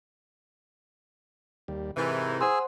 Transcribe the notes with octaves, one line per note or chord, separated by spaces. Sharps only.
D#2 G3
G#2 C3 E3 A#4
G#4 C5 F#5 G#5 C6 E6